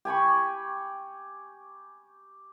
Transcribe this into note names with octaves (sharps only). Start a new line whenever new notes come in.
G4 G#5 B5 C#6